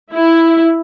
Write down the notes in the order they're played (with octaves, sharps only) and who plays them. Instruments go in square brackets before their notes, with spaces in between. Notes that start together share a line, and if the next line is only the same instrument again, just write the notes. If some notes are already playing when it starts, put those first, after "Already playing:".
[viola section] E4